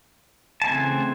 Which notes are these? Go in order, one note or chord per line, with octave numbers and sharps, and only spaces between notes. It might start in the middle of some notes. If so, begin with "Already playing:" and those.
A5
C#3 E3 A3 C4 G#5